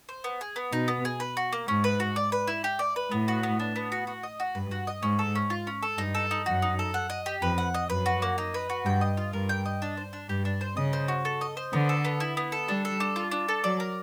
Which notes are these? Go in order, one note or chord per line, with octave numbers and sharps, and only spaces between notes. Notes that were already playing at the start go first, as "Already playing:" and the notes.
C5
B3
G#4
B3
B2 D#4
B3
G#4
B4
F#4
A#3
G#2 C#4
B4
F#4
D5
B4
E4
G4
D5
B4
A2 B3
F#4
B3
D4
B3
F#4
F#4
D#5
F#4
G2 B4
F#4
D#5
G#2 C#4
A4
C#4
F4
C#4
A4
G2 D#4
A4
D#4
F#2 F#4
D#4
A4
F#5
D#5
G4
F2 B4
F#5
D#5
F#2 B4
F#4
A#3
D#4
B4
F#4
G2 G5
D#5
F4
G2 A#4
G5
D#5
D4
C5
D4
G2 G4
D4
C5
C#3 D#5
C5
F#4
A4
D#5
C5
D3 B3
A4
B3
E4
B3
A4
G3 D4
A4
D4
F4
D4
A4
F#3 D5
A#4